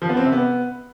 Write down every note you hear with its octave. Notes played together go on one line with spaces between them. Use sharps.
F3
B3
C4
C3
B3